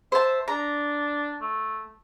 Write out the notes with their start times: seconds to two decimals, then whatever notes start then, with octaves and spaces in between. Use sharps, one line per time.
0.12 C5 E5 A5
0.48 D4 A#5
1.41 A3